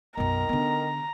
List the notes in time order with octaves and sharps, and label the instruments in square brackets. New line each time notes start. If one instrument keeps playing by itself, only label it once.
[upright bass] B1 F#2 [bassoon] D#3 [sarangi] A#5
[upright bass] D3 B3